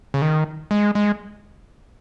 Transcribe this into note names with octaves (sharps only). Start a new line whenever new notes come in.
C#3
D#3
G#3
G#3